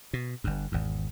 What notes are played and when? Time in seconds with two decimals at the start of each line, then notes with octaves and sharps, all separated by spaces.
0.13 B2
0.44 G1 G2
0.72 G#1 E2